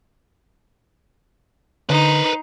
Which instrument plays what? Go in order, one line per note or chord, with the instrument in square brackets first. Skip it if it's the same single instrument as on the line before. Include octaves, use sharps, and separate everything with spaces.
[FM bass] D3 [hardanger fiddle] D#4 [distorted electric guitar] B4 C5